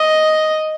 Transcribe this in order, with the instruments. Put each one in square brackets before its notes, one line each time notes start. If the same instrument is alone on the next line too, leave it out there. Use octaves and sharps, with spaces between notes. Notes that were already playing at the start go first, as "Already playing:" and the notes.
Already playing: [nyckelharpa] D#5